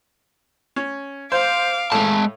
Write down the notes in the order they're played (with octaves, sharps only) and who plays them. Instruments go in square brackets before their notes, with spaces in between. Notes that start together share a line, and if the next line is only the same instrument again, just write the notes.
[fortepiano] C#4
[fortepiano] C5 [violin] F5 D6
[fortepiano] A2 [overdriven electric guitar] G#3 A5